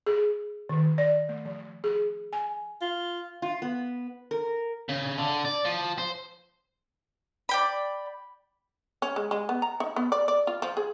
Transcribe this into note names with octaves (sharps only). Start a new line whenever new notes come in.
G#4
D#3
D5
A3
F3
G#4
G#5
F4
F4
B3
A#4
C#3
D3
D5
F3
C5
D5 G5 B5
C#4
G#3
G#3
B3
A#5
D#4
B3
D5
D5
F4
F3
G#4